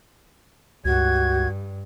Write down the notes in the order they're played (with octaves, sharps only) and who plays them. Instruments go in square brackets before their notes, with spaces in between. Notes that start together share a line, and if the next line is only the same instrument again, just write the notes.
[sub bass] C#2 [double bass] G2 [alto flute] F#4 [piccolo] G#6